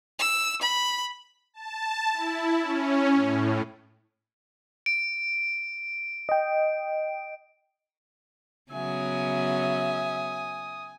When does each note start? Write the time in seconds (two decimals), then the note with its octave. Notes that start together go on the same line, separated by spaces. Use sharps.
0.19 E6
0.61 B5
1.54 A5
2.12 E4
2.61 C#4
3.13 A2
4.86 D7
6.29 D#5 G5
8.72 C#3 F#3 B3 E5 G#5 D#6